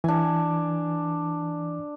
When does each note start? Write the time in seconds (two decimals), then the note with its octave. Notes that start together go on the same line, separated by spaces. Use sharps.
0.04 E3 D4 G#5